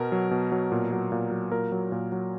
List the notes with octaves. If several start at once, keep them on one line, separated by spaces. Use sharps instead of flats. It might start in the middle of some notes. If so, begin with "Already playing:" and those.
Already playing: B2 A#4
F#3
B2
F#3
A#2
F#3
A#2
F#3
A#2 A#4
F#3
A#2
F#3